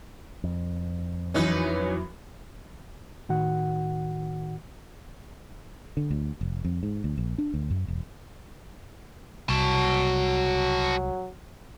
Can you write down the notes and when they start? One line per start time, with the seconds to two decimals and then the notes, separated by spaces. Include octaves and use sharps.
0.44 F2
1.34 F#2 E3 F#3 C#4 D#4 B4
3.29 A2 D#3 F#4 F#5
5.97 D3
6.11 D2
6.41 F1
6.64 F2
6.83 G#2
7.04 D2
7.18 A#1
7.38 D4
7.54 D2
7.71 F#2
7.88 E1
9.49 C2 F#3 F#4 A5